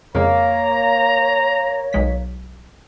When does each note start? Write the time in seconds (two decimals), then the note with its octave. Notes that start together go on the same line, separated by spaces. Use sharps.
0.15 F2 C#3 G#3 A#3 C#5 A#5
1.93 B1 G#3 B6